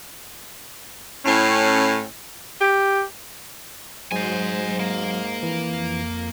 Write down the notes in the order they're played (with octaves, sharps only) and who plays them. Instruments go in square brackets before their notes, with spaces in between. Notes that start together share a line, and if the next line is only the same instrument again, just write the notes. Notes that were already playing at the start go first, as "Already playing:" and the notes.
[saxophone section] A2 C#4
[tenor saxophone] G4
[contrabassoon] G#2 [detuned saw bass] F#3 [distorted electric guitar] C5 G#5
[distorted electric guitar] A#3
[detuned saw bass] F2 [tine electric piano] E3